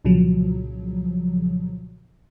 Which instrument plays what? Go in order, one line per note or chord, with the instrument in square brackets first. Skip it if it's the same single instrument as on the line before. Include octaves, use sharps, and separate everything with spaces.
[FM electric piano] C2 A#2 C#3 F3 F#3